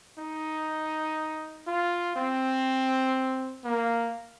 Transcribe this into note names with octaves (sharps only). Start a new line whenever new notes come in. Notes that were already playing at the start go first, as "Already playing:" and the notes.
D#4
F4
C4
A#3